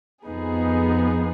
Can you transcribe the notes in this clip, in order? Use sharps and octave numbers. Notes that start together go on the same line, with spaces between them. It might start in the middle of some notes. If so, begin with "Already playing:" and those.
F2 F3 B3 D#4 G#4